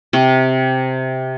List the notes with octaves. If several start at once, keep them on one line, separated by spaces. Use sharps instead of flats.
C3